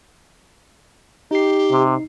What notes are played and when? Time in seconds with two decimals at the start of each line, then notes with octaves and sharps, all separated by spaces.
1.31 D#4 G4 C7
1.71 C3